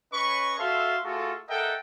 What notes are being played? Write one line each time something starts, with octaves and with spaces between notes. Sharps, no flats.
C#4 B4 C#5 D#5 B5 C#6
F#4 A4 E5 F5 A5 C6
A3 F4 F#4 G#4 A4
A4 A#4 D#5 E5 F#5 G5